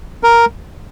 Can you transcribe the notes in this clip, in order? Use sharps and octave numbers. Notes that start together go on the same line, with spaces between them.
A#4